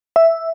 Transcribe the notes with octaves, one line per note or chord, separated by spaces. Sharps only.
E5